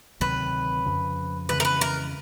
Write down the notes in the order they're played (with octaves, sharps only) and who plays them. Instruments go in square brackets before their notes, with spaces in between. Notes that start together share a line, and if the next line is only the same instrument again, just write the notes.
[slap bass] D2 C3 D#3 F#3 [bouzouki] B4
[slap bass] F2 C#3 F3
[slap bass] F2 C#3 E3 G#3 [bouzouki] B4
[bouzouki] A#4
B4
A#4